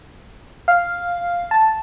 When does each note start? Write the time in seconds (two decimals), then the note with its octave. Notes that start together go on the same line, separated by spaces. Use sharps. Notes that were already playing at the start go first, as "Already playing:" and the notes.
0.68 F5
1.51 A5